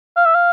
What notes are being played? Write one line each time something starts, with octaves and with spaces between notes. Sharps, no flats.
F5
E5
F5